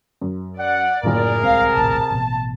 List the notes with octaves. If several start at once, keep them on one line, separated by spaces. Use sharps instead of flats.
F#2
D5 F#5
F#1 A2 F4 G#4 A#4 F5
D1 C2 C3 G#3 F5
A#1 D#2 A2 A5
A1 B2